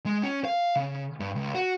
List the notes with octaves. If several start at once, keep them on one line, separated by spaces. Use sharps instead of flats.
G#3
C#4
F5
C#3
G2
C#2
F#4